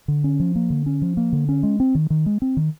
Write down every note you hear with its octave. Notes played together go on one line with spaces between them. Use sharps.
D3
C#4
F3
A#3
D3
C#4
F3
A#3
D3
C#4
G#3
C4
D#3
D#3
G#3
C4
D#3